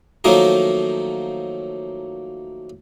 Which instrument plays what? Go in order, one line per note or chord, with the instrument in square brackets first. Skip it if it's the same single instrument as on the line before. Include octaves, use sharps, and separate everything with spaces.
[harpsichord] D#3 F3 F#3 A3 A#3 A#4